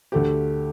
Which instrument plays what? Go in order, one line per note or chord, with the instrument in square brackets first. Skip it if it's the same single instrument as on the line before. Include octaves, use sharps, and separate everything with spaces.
[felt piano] D2 D3 A3 G4